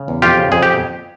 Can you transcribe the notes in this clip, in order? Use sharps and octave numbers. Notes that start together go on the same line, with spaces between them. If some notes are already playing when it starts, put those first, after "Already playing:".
Already playing: C#3
E2
F2 F4 G4
C#3
F2 G#4
G4